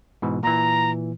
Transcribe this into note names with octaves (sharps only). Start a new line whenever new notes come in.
G#2 B2 E3
A#2 E3 A#5